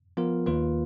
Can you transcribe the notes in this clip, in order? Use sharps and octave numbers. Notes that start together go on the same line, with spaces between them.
F3 B3 F4 A#4
D#2 D#3 A#3 F4 B4